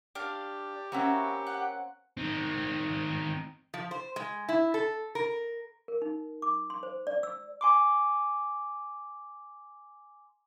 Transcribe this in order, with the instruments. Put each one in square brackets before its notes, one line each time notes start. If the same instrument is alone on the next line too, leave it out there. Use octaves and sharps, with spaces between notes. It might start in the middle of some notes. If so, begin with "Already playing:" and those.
[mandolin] D4 F5 [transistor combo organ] G4
[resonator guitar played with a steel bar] A#3 C4 C#4 [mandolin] E4 F#4
[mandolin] F#5
[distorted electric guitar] D#3 C4
[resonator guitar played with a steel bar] F3
C5
G#3
E4
A4
A#4
[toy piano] A#4
D#4
D6
C6
C5
D5
E6
[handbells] G#5 C6 D6